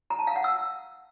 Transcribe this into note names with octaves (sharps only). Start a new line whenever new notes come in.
A#5
A5
F5
F#5
E6